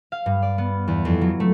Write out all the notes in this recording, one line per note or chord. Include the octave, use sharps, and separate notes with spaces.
F5
G2
D5
B3
E2
F2
F#3
A3